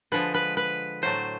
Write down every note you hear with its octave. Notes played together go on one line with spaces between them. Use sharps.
D3 F3 G#3 B4
B4
B4
A2 F#3 A3 C5